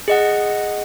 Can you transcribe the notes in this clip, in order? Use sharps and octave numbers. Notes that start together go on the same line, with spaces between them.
G#4 D#5 F#5